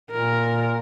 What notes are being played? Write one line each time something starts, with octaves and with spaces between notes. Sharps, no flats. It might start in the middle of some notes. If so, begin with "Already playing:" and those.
A#2 A#4